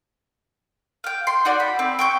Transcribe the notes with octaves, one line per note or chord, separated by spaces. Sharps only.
F5 G5
C6
D#4 F#4 D5
B5
C4
G5 C#6 G6